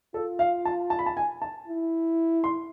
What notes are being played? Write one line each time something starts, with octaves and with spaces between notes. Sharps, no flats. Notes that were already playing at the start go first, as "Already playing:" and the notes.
F4 A4
F5
A5
A5
B5
A5
G#5
A5
E4
C6